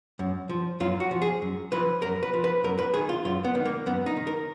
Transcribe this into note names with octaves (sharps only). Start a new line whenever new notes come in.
F#2
F3
F#2 F4
F#4
F3
G#4
F#2
F3 B4
F#2 A#4
B4
F3
B4
F#2 A#4
B4
D#3 G#4
F4
F#2 F4
B3
D#3
A#3
F#2 B3
D#4
D#3
A#4